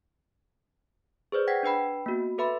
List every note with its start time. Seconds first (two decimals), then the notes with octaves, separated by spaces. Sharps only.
1.32 G#4 B4 C5 D5
1.48 F#5 G5 G#6 A#6 B6
1.63 D4 B4 G5 B5
2.06 A#3 B3 F#4
2.38 A4 B4 E5 B5 C6